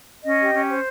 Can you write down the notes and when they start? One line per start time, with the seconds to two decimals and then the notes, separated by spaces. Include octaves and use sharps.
0.24 C#4 D#5
0.39 G4
0.54 C#4
0.69 C5